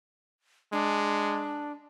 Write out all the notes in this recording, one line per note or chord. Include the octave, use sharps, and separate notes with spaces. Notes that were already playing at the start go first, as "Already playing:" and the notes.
G#3 D4